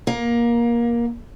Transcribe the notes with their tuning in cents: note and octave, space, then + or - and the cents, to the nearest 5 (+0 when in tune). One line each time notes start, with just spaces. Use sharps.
A#3 +20